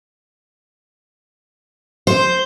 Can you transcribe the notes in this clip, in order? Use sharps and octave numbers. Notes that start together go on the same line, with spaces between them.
C5